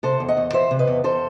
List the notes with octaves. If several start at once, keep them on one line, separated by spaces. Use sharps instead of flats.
C3 A4 C5
E2
D#5 F#5
E2
E3 C5 E5
C3
B4 D#5
E2
E2 A4 C5